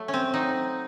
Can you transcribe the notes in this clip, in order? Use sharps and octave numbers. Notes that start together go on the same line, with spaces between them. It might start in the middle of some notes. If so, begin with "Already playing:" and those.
Already playing: F#3 A3
C#4
C4
F#3 D#4